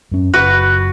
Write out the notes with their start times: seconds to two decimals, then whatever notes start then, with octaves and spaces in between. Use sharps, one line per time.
0.12 F#2 C#4
0.34 F#1 F#4 B4